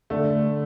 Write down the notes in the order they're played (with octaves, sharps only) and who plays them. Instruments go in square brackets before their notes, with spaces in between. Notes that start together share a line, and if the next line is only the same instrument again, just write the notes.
[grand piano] D3 [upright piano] A3